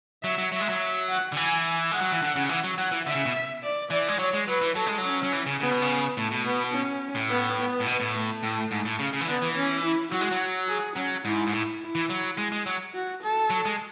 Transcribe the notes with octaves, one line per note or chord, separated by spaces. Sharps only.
F#3 E5
F#3
F#3 E5
G#3
F#3
F#5
D3
E3 G#5
G#3 F#5
F#3
E3
D3
C#3
E3
F#3
F#3 F#5
E3
D3 E5
C#3
B2
D5
E3 D5
G#3
F#3 C#5
G#3
F#3 B4
E3
F#3 A4
G#3
F#3
C#4
F#3
E3
C#3
C#3 B3
B2
C#3
A2 A3
B2
B3
C#4
A2
B3
B3
A2
B2
A2
A3
A2
G#2
A2
C#3
C#3
E3
D3 B3
E3
C#4
E4
F#3 F#4
G#3
F#3
G#4
F#3 C#4
G#2 E4
G#2
A2
E4
E3
F#3
G#3
G#3
F#3
F#4
A4
F#3
G#3